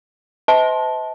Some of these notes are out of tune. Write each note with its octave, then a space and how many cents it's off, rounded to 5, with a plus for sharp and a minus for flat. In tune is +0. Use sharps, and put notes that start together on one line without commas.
C5 -45 D#5 +45 A5 -10